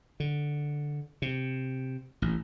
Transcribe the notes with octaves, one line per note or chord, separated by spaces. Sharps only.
D3
C3
A1